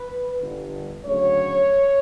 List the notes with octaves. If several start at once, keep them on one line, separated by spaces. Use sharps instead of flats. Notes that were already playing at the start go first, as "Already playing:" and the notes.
Already playing: B4
G1 G2 D3
D2 C#3 F#3 C#5